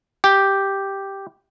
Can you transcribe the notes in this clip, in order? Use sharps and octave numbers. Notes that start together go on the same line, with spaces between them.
G4